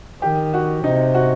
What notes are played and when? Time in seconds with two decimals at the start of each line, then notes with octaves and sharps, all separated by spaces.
0.22 D#3 G4
0.53 F#4
0.84 C3 D#4
1.14 F#4